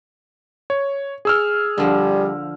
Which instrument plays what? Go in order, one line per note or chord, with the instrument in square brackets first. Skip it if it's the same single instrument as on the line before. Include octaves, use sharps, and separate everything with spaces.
[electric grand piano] C#5
G#4 E6 F6
[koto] D3 F3 [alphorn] G3